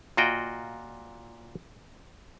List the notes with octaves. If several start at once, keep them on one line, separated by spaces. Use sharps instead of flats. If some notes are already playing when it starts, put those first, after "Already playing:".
A#2 F4 F#4 D#5 G5